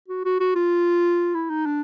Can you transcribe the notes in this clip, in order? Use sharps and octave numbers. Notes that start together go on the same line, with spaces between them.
F#4
F#4
F#4
F4
E4
D#4
D4